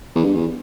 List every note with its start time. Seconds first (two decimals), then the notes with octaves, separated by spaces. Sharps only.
0.16 E2
0.24 G2
0.35 E2